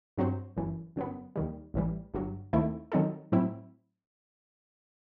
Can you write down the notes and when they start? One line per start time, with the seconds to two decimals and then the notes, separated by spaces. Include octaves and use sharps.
0.18 G2 F#3 C4 F#4 C5
0.57 G1 F#2 E3
0.96 G1 F#2 F#3 B3
1.36 D#2 D#3 G3
1.74 A1 A2 E3 G3
2.14 G1 G2 F#3
2.53 D#2 D#3 A3 C4 E4
2.92 D#3 F#3 C4 D#4 A4
3.32 A2 F#3 C4 E4